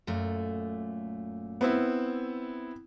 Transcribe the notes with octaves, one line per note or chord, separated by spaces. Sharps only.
F#2 A#2 A3
B3 C4 E4